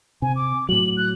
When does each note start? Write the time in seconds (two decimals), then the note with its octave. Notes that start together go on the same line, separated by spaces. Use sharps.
0.22 C3 G#5
0.36 D6
0.69 A2 F#3 F#7
0.97 F#6